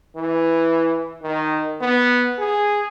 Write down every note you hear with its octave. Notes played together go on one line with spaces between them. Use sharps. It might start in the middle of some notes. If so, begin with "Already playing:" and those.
E3
D#3
B3
G#4